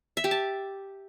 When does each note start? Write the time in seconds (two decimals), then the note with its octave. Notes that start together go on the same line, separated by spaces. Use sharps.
0.17 E5
0.24 G4
0.31 A5